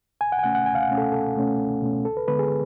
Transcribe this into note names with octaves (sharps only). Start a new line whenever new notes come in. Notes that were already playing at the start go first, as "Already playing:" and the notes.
C#2 G#5
F#5
G#5
B2 A3 C#4 F#5
F#5
C#2 G#5
F5
F#5
B2 A3 C#4
A4
C#2 A4
B2 A3 C#4
C#2
B2 A3 C#4
D2 A4
B4
D3 G#3 B3 B4
G#4